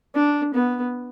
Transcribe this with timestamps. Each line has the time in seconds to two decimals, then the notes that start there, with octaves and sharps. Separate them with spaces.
0.15 D4
0.54 B3